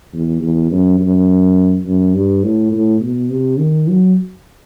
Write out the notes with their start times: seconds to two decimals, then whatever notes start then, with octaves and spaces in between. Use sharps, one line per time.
0.13 E2
0.41 E2
0.71 F#2
1.00 F#2
1.86 F#2
2.14 G2
2.43 A2
2.72 A2
3.01 B2
3.30 C3
3.59 D#3
3.88 F#3